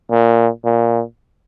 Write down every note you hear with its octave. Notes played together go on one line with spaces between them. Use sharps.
A#2
A#2